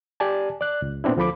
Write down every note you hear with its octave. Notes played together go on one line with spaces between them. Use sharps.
G4 D5 G#5 A5
D5 F#6
C#2
A#2 B3 C4 D4 E4
D2 F3 A4 B5 D6